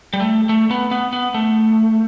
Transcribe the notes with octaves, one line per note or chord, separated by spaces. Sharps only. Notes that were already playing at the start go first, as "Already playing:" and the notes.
G3
A3
A3
B3
B3
B3
A3